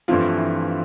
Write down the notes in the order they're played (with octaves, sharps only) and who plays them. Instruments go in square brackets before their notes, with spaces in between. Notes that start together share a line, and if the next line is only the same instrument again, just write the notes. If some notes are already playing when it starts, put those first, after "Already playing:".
[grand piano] G2 E3 A3 C4 E4 [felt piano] F3 F4
[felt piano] E3